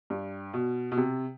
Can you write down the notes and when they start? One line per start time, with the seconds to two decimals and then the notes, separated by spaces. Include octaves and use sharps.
0.10 G2
0.54 B2
0.92 B2
0.97 C3